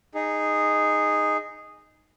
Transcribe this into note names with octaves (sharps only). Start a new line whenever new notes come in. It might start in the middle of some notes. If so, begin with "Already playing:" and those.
D#4 G#4